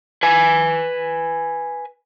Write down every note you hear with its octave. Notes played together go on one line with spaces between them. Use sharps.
B4 G#5